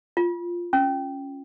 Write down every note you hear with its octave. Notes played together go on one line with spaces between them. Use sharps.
F4
C#4